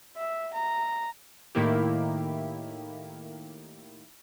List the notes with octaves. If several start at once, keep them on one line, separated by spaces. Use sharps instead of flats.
E5
A#5
A2 D#3 A#3 E4 G4